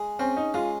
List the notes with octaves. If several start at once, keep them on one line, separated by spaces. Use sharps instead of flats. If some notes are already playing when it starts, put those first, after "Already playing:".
Already playing: G#3 G#4
C4 C#4
D#4
G#3 F4